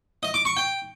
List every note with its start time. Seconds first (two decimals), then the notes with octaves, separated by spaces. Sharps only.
0.23 D#5
0.34 D6
0.45 C#6
0.57 G5